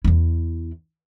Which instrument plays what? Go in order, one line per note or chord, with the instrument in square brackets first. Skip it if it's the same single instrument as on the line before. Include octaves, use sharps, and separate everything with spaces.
[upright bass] E2 E4